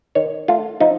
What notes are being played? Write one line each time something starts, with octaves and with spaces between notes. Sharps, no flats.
D#3 C#5
A3 F4
F3 D#4